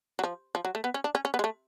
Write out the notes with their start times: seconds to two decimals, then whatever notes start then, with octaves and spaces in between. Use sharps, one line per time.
0.19 F#3
0.24 F3
0.55 F3
0.65 F#3
0.75 A3
0.84 B3
0.94 C#4
1.04 D4
1.15 C#4
1.25 C#4
1.34 B3
1.39 G#3
1.44 A3